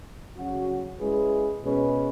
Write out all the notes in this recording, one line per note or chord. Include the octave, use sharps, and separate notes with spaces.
C#3 F#3 C#4 F#4
G#3 C#4 E4 G#4 B4
B2 G#3 C#4 G#4 B4